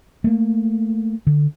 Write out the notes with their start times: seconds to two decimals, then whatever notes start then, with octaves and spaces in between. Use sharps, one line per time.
0.24 A3 A#3
1.27 D3